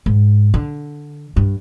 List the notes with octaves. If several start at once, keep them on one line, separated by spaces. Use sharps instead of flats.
G#2
D3
G2